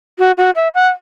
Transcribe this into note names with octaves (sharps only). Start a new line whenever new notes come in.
F#4
F#4
E5
F#5